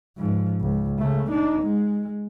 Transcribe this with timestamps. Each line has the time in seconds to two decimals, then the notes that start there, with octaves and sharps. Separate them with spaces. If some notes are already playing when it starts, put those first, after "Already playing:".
0.17 G#2 F3
0.61 C#2
0.99 C#3 A3
1.30 D4 D#4
1.63 G#3